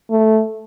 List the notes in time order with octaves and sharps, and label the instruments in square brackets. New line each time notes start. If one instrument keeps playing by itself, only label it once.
[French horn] A3